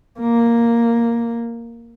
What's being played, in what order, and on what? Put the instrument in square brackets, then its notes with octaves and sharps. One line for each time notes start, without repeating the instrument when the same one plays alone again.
[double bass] A#3